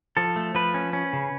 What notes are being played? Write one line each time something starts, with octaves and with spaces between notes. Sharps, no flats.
F3 A4
A3
F3 B4
C#4
C#4
C#3